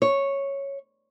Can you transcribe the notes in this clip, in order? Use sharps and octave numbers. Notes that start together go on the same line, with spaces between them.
C#5